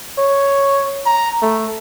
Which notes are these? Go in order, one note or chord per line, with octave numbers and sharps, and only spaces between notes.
C#5
A#5
A3